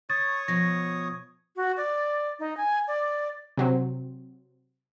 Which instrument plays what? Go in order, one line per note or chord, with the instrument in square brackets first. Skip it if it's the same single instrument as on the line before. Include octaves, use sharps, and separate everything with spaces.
[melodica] C#5 C#6 D#6 [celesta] A6
[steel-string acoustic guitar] B2 F3 [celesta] A#6
[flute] F#4
D5
D#4
G#5
D5
[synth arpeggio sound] C3 F#3 C4